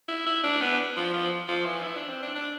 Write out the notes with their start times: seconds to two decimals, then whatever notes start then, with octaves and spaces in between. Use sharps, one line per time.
0.08 E4
0.26 E4
0.44 D4
0.61 B3
0.97 F3
1.14 F3
1.48 F3
1.65 E3
1.83 E4
1.96 D4
2.09 C4
2.22 D4
2.35 D4